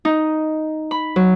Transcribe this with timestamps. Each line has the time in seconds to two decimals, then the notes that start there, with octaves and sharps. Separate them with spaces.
0.05 D#4
0.91 B5
1.16 F#3